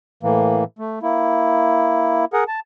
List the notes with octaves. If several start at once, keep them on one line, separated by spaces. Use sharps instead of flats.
A2 E3 A#3
A3
A#3 E4
G#4 A#4 F#5
A5